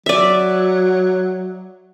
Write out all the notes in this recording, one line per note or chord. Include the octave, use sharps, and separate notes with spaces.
F#3 D5 E5